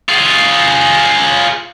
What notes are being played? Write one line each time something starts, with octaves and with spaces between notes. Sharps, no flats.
F4 G#4